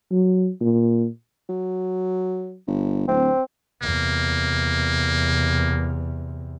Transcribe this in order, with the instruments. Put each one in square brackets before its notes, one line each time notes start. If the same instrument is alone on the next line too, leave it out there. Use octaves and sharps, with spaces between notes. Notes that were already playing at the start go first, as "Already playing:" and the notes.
[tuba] F#3
A#2
[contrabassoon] F#3
G1
[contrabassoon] D1 [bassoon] C4
[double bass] E2 C3 [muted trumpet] A#3